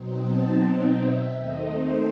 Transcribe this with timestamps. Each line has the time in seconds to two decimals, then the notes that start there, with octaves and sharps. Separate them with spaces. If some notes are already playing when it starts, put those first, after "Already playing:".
Already playing: B2 F#3 C4 D#4
0.26 A5
0.63 G5
1.00 E5
1.36 D#2 D#3 A3 C4 D#4 D#5
1.73 C5